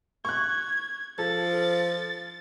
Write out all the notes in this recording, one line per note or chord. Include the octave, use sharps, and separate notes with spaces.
C#6 F#6 G#6
F3 A4 A6